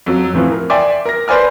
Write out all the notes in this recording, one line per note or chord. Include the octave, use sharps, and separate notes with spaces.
F2 F#3
A2 C3 E3 F3
A#4
D5 E5 G5 G#5 C6 D6
A#4 A#6
B4 C5 D5 G#5 F6